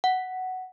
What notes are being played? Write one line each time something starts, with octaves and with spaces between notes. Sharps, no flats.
F#5